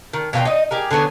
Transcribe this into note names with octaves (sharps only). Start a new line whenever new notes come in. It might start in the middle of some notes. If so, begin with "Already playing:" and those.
D#3
B2 F4 A4 G5
D#4 D#5
G4 G#4 A#4
D3 F#3 B3 C#4